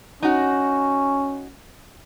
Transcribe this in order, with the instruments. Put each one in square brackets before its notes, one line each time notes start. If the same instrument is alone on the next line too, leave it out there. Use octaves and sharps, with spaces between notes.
[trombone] C#4 [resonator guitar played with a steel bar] D#4 F#4